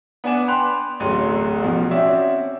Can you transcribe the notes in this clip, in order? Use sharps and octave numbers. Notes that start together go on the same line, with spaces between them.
B3 D4 F#5 G#5 D6 E7
G5 B5 C6 D6 F#6 F7
D1 A1 F#3 A3 C6 D#7
A1 B2 F3
C4 C#4 F#4 D5 E5